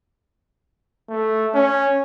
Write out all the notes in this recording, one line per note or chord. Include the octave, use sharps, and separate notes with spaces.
A3
C#4